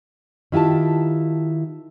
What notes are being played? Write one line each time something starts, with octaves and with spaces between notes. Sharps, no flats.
D#3 E4 F4 G4 A5